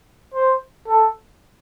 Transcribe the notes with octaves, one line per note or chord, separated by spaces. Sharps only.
C5
A4